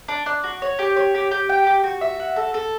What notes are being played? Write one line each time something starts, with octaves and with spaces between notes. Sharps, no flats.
D4
D4
F#4
C#5
G4
C#5
G4
G4
G5
G4
F#4
E5
F#4
A4
A4